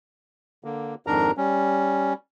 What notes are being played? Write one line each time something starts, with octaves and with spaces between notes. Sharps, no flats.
D3 A#3
F2 G#2 D#3 D4 A#4 A#5
G3 C#4